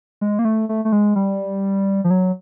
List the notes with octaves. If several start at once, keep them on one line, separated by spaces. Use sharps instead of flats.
G#3
A#3
A3
A3
A3
G#3
G3
F3
F#3